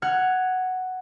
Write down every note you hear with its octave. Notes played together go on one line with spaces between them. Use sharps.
F#5 F6 G#6